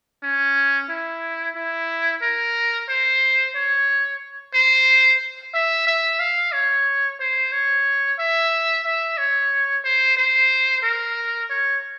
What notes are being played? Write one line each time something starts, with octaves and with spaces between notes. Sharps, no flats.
C#4
E4
E4
A#4
C5
C#5
C5
E5
E5
F5
C#5
C5
C#5
E5
E5
C#5
C5
C5
A#4
C#5